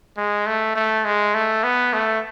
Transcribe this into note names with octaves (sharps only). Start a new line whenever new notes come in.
G#3
A3
A3
G#3
A3
B3
A3